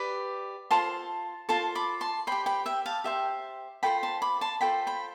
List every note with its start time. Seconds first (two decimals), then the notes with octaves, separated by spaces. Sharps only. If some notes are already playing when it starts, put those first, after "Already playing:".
Already playing: G4 B4 D5
0.71 F4 A4 C5 A5 C6
1.49 F4 A4 C5 A5 C6
1.75 B5 D6
2.01 A5 C6
2.27 G4 C5 G5 B5
2.46 G5 B5
2.66 E5 G5
2.86 F5 A5
3.04 G4 C5 E5 G5
3.83 F4 A4 C5 G5 B5
4.03 A5 C6
4.22 B5 D6
4.41 A5 C6
4.61 F4 A4 C5 G5 B5
4.87 G5 B5